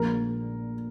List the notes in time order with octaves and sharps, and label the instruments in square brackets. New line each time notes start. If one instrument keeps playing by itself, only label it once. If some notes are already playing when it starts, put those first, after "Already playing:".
Already playing: [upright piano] A#1 A#2 F3 G#3 A#4